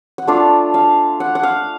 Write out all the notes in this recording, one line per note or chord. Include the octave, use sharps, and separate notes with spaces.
F#5
A3 D4 F4 F5
F5
F#5
F#5
F5